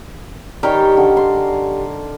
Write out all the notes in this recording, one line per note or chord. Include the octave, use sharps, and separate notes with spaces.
D#3 G3 C#4 G4 A#4
D3
C6